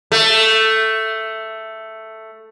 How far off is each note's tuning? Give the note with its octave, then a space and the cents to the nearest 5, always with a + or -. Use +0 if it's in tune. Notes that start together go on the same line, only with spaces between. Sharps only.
A3 +5